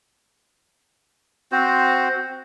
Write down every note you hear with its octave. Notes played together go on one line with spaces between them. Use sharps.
C4 F#4 C5